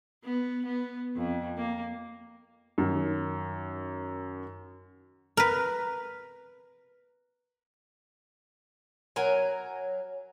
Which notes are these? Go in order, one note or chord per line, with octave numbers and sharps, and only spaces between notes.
B3
B3
F2
A#3
F#2 D#3
A#4 B4
F#3 A#4 G#5